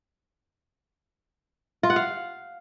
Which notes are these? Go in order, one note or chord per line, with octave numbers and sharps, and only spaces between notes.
F4
F#5
F5